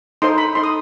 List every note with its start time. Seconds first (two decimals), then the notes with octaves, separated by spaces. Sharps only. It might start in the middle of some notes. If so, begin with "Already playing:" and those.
0.22 D#4 A4 C5 C6
0.38 B5
0.55 D#4 A4 C5 C6
0.64 D#6